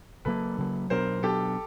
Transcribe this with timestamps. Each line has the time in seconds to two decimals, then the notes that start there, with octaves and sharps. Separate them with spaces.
0.25 C#3 F#3 A#3 A4 B4
0.58 C#3 F#3 A#3
0.90 B2 F#3 B3 D4 A#4 C5
1.23 B2 F#3 B3 D4 G4 A4